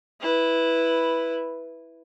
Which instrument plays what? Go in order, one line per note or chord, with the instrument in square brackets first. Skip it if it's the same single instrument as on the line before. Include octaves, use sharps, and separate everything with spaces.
[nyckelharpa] E4 B4